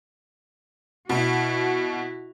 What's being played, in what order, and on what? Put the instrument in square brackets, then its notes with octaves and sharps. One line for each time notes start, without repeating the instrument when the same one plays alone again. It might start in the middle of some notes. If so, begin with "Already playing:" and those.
[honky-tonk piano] B2 [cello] E4 F#4